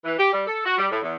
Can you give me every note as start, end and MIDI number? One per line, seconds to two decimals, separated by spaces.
0.04 0.16 52
0.18 0.29 67
0.33 0.46 55
0.47 0.63 69
0.65 0.76 66
0.78 0.86 55
0.91 0.99 45
1.02 1.16 40